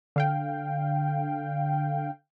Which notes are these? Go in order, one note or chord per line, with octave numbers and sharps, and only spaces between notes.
D3 F5 G5